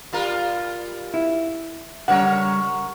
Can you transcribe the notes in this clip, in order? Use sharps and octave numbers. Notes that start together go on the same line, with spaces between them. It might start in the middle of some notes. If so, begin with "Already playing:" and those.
G3 F4 A#4
E4
C#3 G3 A#4 C#5 F#5